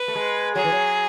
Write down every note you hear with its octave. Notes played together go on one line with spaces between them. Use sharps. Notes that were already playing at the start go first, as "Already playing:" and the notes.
Already playing: B4
A3
G#3
F#3 G#4
E3
F#3